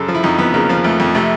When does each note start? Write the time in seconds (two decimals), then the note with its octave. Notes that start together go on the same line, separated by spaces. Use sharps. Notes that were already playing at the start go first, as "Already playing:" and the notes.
Already playing: F#2 C#3 A4
0.08 F3
0.15 E4
0.23 F2 D#4
0.38 F2 B3
0.54 C#3 A#3
0.69 F3
0.84 F2 A3
1.00 F2
1.15 C3 A3